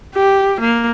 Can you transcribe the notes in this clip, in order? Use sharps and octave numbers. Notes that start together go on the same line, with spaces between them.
G4
A#3